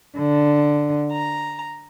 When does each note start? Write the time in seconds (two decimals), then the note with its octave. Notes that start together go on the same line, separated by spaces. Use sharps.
0.18 D3
1.13 A#5